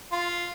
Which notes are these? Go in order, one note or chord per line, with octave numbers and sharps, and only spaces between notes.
F4